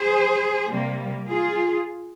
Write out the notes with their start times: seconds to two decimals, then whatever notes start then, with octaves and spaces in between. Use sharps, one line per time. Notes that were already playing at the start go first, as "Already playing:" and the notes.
Already playing: G#4 C5
0.68 C3 G3 A#3
1.28 F4 G#4